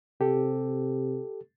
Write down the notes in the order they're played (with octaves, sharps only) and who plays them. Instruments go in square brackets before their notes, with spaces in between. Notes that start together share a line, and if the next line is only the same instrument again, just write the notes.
[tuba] C3 [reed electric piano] G4 A4